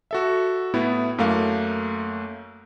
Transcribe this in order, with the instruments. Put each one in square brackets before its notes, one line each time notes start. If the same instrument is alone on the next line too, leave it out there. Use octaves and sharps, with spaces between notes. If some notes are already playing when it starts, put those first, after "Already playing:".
[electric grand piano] F#4 A4 E5
A2 B3 E4
F#2 A3 A#3 F5